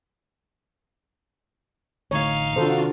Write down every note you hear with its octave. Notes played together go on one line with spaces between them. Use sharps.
A1 D3 A3 D#4 C#5 F5
C3 D#3 D4 F4 F#4 A4 C5